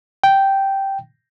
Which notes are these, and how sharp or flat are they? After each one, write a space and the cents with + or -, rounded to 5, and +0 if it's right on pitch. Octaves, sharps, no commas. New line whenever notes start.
G5 -5